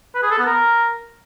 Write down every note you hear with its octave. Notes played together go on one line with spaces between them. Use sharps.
B4
G#4
A4
B3
A#4